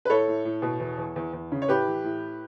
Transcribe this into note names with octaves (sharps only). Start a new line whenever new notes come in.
B4
A2 A4 C#5
A2
A2
B2
E2
E2
E2
E2
C#3
C#5
A2 G4 B4
E3
A2